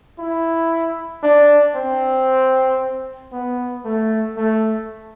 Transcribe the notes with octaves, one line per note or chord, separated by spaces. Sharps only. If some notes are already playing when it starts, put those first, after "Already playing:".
E4
D4
C4
B3
A3
A3